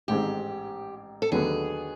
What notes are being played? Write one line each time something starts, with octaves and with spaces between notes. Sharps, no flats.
A1 G#2 D#3 G#3 C4 G4
A4
D#2 D3 F#3 B3 G#4